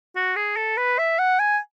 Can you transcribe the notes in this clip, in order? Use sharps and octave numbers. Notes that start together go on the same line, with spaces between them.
F#4
G#4
A4
B4
E5
F#5
G#5